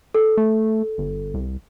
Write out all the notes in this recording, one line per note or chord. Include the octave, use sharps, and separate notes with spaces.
A4
A3
G1
C2